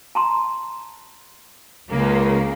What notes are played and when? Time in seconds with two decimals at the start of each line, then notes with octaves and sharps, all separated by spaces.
0.15 A5 A#5 C6
1.89 C#2 C#3 A#3